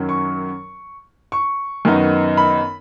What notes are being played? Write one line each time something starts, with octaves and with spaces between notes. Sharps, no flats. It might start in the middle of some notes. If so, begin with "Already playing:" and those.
Already playing: F#2 D#3 F#3 C#4
C#6
C#6
F#2 D#3 B3 D#4
B5